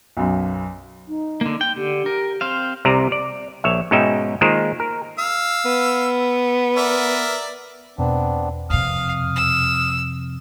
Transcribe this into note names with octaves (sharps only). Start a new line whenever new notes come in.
B1 F#2
D#4
D3 A#3
G5
D3 G4
A#4
C4 C5 F5
C2 C3 D5 A#5
D5
A#1 C#5 E5
G#2 B2 C#4 D#4 E5 G5
D#3 G#3 A#3 F4 A#4 C5
A#4
F5 E6
B3
A#4 D5 E5
E2 B2 B3 C4 D4
F2 C3 F5 D#6 F6
E6